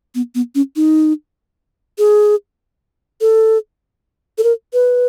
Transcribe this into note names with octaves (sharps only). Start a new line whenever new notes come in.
B3
B3
C#4
D#4
G#4
A4
A4
A#4
B4